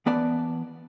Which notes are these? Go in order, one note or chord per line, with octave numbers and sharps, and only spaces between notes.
E3 B3 D5 A5